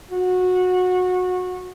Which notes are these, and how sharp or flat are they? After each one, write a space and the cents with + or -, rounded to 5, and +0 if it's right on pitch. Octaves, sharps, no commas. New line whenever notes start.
F#4 -20